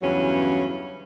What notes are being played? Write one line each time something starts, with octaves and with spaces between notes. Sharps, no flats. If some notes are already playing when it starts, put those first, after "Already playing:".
E2 G2 C#3 E3 F#3 C#4